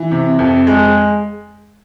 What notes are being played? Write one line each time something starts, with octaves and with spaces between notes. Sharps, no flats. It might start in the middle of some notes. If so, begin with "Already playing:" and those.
Already playing: E3
C3
F2
G#3